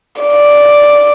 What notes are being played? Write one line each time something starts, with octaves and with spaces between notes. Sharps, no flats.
D5